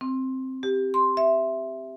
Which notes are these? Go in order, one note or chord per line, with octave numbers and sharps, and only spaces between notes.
C4
G4
C6
E5